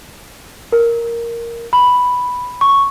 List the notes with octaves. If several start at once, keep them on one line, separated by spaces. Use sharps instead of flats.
A#4
B5
C#6